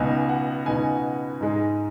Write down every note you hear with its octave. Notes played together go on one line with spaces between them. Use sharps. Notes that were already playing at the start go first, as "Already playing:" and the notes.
Already playing: C#2 B2 B3 D#4 G#5
F#5
C#2 B2 B3 D#4 G#5
G#2 G#3 D#4